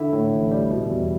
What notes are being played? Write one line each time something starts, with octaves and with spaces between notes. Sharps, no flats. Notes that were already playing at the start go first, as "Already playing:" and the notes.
Already playing: D3 E4 E5
A2
A1
G3
B2
E2